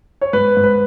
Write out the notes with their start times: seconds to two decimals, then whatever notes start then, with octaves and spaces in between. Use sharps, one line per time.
0.21 C#5
0.33 G#2 B4
0.57 G#2
0.64 B4